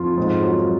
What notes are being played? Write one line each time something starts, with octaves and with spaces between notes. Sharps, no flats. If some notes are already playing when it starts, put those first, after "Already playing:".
Already playing: F2 F3 F4
G#2
F#3